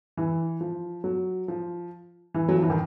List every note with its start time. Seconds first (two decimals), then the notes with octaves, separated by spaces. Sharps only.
0.17 E3
0.61 F3
1.04 F#3
1.48 F3
2.34 E3
2.49 F#3
2.55 F3
2.63 E3
2.70 D#3